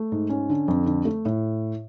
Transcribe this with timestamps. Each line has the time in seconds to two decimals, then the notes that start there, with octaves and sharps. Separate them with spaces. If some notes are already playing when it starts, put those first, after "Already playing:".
Already playing: A3
0.12 G#2
0.30 C#4
0.49 D3
0.68 F2
0.86 D3
1.05 A3
1.25 A2